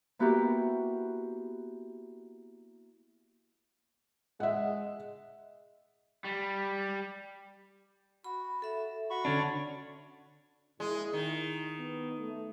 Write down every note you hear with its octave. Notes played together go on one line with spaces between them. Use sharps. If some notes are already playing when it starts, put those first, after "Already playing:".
A#3 B3 E4 F#4 G4 A#4
G#3 E5 F#5
G3
F#4 B5
A4 E5
F#4 B5 C#6
D3 C#4 D4 A4
A#2 G#3 E4
D#3
B3
A3